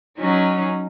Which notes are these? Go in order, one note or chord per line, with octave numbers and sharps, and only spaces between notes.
F#3 C#4 D#4